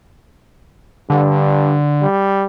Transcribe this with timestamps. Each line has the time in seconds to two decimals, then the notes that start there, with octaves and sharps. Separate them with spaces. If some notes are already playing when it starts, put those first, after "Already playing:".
1.10 G2 D3
2.02 G3